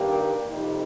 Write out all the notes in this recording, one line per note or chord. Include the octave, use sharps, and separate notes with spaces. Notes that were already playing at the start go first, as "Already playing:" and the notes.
Already playing: G2 D#3 A#3 G4
F2 C3 G3 C4 D#4